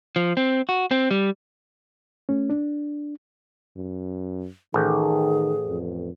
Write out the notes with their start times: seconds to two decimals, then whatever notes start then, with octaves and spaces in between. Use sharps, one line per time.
0.16 F3
0.37 C4
0.69 F#4
0.91 C4
1.11 G3
2.29 A3 C#4
2.50 D4
3.76 F#2
4.74 A1 D#3 G#4
5.68 F2